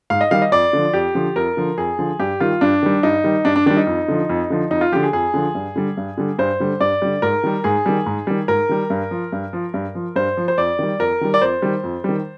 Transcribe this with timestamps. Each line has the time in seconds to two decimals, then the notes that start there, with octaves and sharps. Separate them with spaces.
0.10 G#2 F5
0.21 D#5
0.31 D#3 G3 F5
0.42 D#5
0.52 F2 D5
0.73 D3 F3
0.93 F2 G4
1.15 D3 F3
1.36 F2 A#4
1.57 D3 F3
1.78 F2 G#4
1.99 D3 F3
2.20 G2 G4
2.40 D#3 G3 F4
2.61 G2 D4
2.83 D#3 G3
3.03 G2 D#4
3.24 D#3 G3
3.45 G2 D4
3.56 D4
3.66 D#3 G3 D4
3.77 D#4
3.87 F2
4.08 D3 F3
4.29 F2
4.50 D3 F3
4.71 F2 D#4
4.81 F4
4.92 D3 F3 G4
5.03 G#4
5.13 F2 G#4
5.34 D3 F3
5.55 G2
5.76 D3 G3
5.97 G2
6.18 D3 G3
6.39 G2 C5
6.60 D3 G3
6.80 G2 D5
7.02 D3 G3
7.22 G#2 A#4
7.44 D#3 G3
7.64 G#2 G#4
7.86 D#3 G3
8.06 G#2
8.27 D#3 G3
8.48 G#2 A#4
8.69 D#3 G3
8.90 G2
9.11 F3
9.32 G2
9.53 F3
9.74 G2
9.95 F3
10.16 G2 C5
10.37 F3
10.48 C5
10.58 F2 D5
10.79 D#3 G3
10.99 F2 A#4
11.21 D#3 G3
11.34 D5
11.42 F2 C5
11.62 D#3 G3
11.84 F2
12.04 D#3 G3